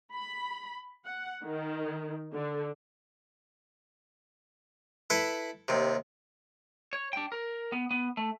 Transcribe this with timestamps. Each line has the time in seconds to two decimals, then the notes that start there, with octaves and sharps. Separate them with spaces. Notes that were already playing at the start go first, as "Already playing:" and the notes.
0.13 B5
1.04 F#5
1.44 D#3
2.33 D3
5.10 E4 A4 B4
5.68 D#2 C3
6.93 C#5
7.13 D4 G5
7.32 A#4
7.72 B3
7.91 B3
8.17 A3